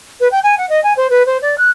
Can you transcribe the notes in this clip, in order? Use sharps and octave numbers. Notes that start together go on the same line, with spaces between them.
B4
G5
G#5
F#5
D#5
G#5
C5
B4
C5
D5
F#6